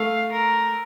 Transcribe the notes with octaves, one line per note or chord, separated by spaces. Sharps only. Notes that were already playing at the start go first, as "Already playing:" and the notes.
Already playing: A3 F5
A#4